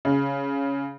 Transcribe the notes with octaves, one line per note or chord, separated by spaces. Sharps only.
C#3